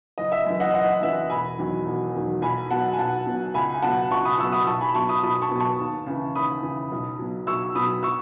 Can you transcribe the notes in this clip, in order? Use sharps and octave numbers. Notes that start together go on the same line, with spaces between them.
F#1 D#5
E5
F#2 E3
D#5 F#5
F#1 D#5 F#5
F#2 E3 E5
E1 G#5 B5
E2 D#3 F#3
E1
E2 D#3 F#3
B1 G#5 B5
B2 F#3 F#5 A5
G#5
B1 F#5 A5
B2 F#3
C#2 G#5 B5
G#5
B2 F#3 F#5 A5
C#2 A5 C#6
B5 D#6
B2 F#3 C#6 E6
B5 D#6
B1 A5 C#6
G#5 B5
B2 F#3 A5 C#6
B5 D#6
B1 B5 D#6
A5 C#6
B2 F#3
A5 C#6
D#2
C#3 E3
D#2 B5 D#6
C#3 E3
B1
B2 F#3
B1 C#6 E6
B2 F#3 B5 D#6
C#6 E6